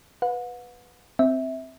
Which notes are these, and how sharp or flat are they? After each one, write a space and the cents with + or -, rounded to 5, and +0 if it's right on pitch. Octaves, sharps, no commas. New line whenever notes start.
B4 +0 F#5 -40
C4 +0 E5 -15